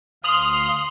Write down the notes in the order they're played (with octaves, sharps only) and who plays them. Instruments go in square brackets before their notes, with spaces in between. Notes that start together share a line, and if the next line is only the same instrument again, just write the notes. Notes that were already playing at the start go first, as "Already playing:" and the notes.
[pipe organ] D2 F5 [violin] C6 [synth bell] D#6 F7 F#7